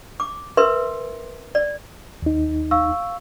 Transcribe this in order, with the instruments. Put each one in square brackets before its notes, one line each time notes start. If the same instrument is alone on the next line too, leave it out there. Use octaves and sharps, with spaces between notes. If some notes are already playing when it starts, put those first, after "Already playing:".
[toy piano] D6
A#4 B4 E5 C6
D5
[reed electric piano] D#2 D#4
[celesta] F5 C#6 E6